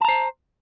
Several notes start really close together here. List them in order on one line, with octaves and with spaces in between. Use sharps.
A5 A#5 C5